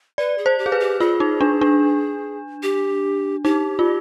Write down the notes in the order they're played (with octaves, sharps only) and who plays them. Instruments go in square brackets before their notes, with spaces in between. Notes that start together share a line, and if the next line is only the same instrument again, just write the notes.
[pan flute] B4 [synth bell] D5
[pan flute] G#4
[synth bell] C5
[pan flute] G4
[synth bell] G#4
B4
[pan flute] G4
[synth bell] F4 [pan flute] G#4
[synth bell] D#4
D4
D4
[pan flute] G4
[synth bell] D#4 [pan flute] G4
[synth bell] F4